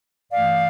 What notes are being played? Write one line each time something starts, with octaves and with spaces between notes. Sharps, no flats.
G2 E3 A3 D5 F5